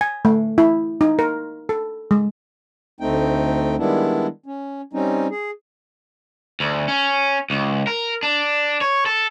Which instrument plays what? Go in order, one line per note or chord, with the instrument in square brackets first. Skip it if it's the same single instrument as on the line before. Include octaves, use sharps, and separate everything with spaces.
[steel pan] G#5
A3
E4
D#4
A#4
A4
G#3
[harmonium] D2 A3 C4 D#4 G5
D#3 G3 G#3 B3 D4 E4
C#4
G3 C4 C#4 D#4
G#4
[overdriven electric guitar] D2
C#4
C#2
A#4
D4
C#5
A4